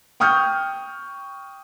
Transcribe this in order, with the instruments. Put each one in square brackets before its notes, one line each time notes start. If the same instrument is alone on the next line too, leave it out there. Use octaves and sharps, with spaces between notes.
[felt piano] G5 C#6 D#6 F6 G6